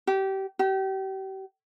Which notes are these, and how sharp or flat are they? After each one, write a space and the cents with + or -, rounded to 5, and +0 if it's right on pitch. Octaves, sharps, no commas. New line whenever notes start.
G4 -25
G4 -35